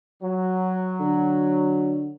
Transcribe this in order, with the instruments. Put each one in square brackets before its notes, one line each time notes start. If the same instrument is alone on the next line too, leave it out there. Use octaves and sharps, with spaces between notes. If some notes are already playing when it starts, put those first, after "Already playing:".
[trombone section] F#3
[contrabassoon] D3